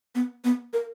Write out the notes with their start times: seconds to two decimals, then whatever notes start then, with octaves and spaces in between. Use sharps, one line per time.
0.15 B3
0.44 B3
0.73 A#4